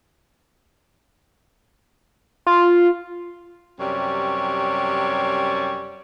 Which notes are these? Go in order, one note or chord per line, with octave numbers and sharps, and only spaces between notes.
F4
F#2 C3 G3 C#5